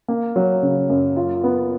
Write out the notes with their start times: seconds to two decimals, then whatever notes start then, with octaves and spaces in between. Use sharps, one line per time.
0.08 A#3
0.36 F#3
0.62 C#3
0.89 F#2
1.16 F4
1.44 B3